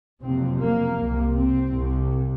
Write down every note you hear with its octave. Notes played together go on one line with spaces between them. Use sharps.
F#1 F2 C3 C4
A#3
C2 C3
C4
C2 C3